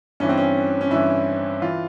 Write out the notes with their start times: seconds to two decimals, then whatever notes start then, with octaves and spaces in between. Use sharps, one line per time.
0.20 G2 E3 C#4
0.29 C4
0.37 C#4
0.81 C#4
0.91 G2 E3 E4
1.62 E3 F4